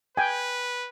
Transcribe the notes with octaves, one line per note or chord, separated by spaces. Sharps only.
B4 G5 G#5